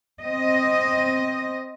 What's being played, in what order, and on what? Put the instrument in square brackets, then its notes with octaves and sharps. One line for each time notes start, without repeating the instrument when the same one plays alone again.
[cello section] C4 D#5